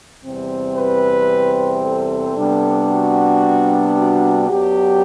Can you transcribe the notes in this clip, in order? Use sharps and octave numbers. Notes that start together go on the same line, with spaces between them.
E2 C3 G3 C4
B4
A4
C3 G3 B3 D4
F#4
F#4
F#2 F#3 B3 D4 G4